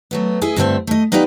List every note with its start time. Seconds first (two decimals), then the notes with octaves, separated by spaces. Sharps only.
0.11 F#3 A3 B3
0.41 E4 G#4 D#5
0.56 G2 D3 E3 A3 C4 E5
0.87 A3 D#5
1.12 B3 D#4 F4 G4 B4 D5